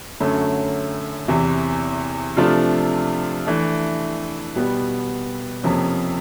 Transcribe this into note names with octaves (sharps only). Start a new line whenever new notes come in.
F#2 D3 F#3 A3 C#4
E2 C3 E3
C3 F3 A3 D4 F4
E3 A3 D4
B2 G3 B3
F2 C3 F3 A#3 C#4